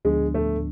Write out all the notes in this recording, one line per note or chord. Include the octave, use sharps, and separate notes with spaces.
D2 D3 F3 G#3 B3 D4
A3